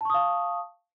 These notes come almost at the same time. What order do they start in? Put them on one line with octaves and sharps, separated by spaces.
A5 C#6 D#6 F5